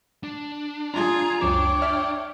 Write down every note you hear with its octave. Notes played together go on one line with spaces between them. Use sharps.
D4
D4 F4 G#4 A#5
C#2 F#2 F3 D4 C#5 G5 D6
D5 E5 F6